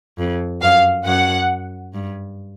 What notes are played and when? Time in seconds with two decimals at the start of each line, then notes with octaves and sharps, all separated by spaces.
0.18 F2
0.62 F#2 F5
1.05 F#2 F#5
1.94 G2